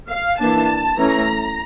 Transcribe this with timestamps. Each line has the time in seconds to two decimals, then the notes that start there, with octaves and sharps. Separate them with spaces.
0.09 F5
0.39 E3 A#3 D4 A5
0.98 E3 A3 C#4 A#5